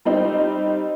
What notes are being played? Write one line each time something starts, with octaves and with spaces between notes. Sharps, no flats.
G3 C4 D#4